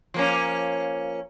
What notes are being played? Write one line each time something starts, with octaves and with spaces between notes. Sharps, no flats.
F3 A#3 C#4